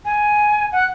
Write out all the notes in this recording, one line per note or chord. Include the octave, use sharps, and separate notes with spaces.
G#5
F#5